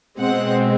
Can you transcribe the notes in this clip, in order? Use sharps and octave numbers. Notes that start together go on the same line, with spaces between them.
B2 G#3 C4 F#5